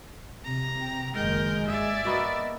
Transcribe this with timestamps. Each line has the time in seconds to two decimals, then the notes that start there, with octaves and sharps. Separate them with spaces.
0.45 C3 A#5
0.81 G5
1.14 F#1 D#3 G#3 A#4 G6
1.67 G2 G#4 D5 E5
2.05 A#3 B3 F#4 D#5